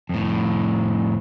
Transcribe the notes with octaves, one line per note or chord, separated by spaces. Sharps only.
F2 A2